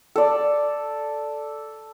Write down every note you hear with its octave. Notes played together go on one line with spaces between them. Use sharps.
A4 D5